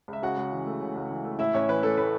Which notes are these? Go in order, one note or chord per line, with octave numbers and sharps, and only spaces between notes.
C#2 E5
C#3 F#4 F#5
C#2
E3
A3
C#3
C#2
E3
A3
A2 E4 E5
A1 C#4 C#5
E3 B4
A3 A4
A2 B4